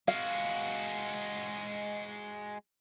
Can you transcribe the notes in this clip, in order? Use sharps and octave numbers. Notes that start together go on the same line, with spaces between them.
G#3 F#4 F5